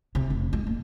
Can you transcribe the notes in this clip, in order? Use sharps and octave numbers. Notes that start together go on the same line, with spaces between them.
C3
F1
G#3
A#3